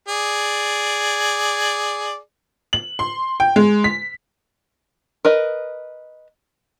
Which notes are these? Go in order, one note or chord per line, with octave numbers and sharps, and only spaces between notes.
G#4 D5
F#7
C6
G5
G#3
B6
A#4 B4 D#5